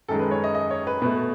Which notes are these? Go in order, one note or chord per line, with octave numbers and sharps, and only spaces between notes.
F#2 D#3 G#3 A4
B4
C#5
D#5
D#5
C#5
B4
B2 A3 B4